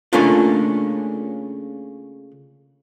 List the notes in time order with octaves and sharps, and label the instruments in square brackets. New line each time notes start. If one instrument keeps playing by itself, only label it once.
[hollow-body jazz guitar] C#3 A3 A#3 C#4 D4 F4